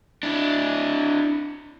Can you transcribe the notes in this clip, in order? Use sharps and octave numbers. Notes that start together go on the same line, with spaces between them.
D4 E4